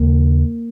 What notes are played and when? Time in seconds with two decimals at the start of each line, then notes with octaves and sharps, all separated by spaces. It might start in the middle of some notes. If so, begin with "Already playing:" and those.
Already playing: D#2 C#3 A#3